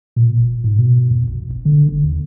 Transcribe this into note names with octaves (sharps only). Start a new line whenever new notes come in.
A#2
F1
G#2
B2
F2
A#1
F1
D3
G1
D#2